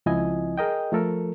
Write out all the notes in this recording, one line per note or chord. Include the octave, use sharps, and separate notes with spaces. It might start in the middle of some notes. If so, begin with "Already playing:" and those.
C#2 F3 C4 E4 D#5 G#5
G#4 A#4 D#5 G5
F3 A3 A4 A#4